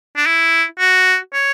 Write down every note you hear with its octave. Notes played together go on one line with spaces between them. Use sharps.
D4
E4
F#4
C#5